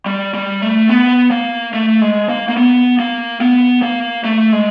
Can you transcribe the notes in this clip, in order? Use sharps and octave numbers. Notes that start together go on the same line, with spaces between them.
G3
G3
A3
B3
A#3
A3
G#3
A#3
A#3
B3
A#3
B3
A#3
A3
G#3